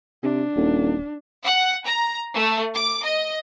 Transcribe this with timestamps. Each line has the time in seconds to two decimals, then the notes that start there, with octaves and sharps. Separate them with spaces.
0.23 C3 D4
0.56 D#1
1.44 F#5
1.85 A#5
2.34 A3
2.73 D6
3.03 D#5